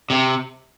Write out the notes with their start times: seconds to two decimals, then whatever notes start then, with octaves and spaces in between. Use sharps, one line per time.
0.10 C3